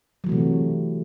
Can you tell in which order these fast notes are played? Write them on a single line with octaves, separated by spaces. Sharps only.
F#3 E3 A3 C3